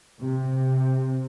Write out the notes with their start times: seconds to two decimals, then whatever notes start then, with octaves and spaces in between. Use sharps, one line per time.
0.19 C3